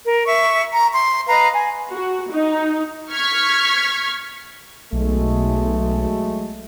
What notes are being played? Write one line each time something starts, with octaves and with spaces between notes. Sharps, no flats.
A#4
E5 C#6
A#5
C6
B4 D#5 F5 A#5
G#5
F#4
D#4
C#6 F6 G#6 B6
B1 F#3 G#3 A3